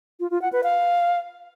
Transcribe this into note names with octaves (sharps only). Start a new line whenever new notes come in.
F4
F4
F#5
B4
F5